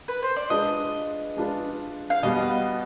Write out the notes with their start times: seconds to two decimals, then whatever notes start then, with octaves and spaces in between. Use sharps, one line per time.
0.08 B4
0.22 C5
0.36 D5
0.50 G#3 D4 F4 B4 D#5
1.37 G#3 D4 F4 B4
2.10 F5
2.23 B2 G3 B3 D#5